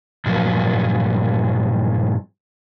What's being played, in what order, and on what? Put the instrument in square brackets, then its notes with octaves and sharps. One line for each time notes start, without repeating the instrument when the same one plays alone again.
[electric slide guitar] G2 A#2 F3 F#3